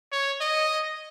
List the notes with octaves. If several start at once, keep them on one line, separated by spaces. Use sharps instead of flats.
C#5
D#5